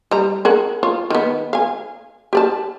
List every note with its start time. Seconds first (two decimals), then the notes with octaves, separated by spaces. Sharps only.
0.11 G3 A#5
0.45 G#4 A#4 F#5
0.83 F4 C#5
1.10 D#3 B3
1.53 F5 G#5
2.33 G4 D5 A5